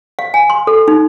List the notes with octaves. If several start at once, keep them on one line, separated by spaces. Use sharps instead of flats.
F5
G#5
C6
A4
D#4